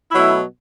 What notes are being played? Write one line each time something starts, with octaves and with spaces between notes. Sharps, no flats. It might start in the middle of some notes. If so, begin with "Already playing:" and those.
B2 F#3 A3 E4